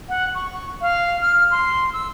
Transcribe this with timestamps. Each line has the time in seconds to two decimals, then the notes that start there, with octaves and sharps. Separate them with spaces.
0.08 F#5
0.34 C#6
0.81 F5
1.21 F6
1.51 C6
1.92 E6